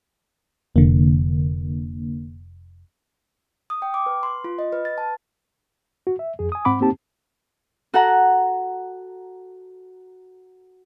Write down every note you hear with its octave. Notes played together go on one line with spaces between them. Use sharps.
F1 D3 A#3
D#6
G5
D6
B4
C6
F4
D#5
B4
A6
A5
F#4
E5
F2 G#4
G#5 D#6
G#2 C4 F#5 B5 D6
A#3 C4 D#4 G4 A5
F#4 A4 F#5 A#5